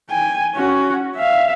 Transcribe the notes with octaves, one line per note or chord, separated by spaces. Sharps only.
G5 G#5
C#4 F#4
E5 F5